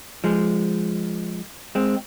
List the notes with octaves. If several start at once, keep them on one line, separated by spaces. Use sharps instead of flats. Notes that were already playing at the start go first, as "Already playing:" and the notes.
F3 G#3
G#3 C4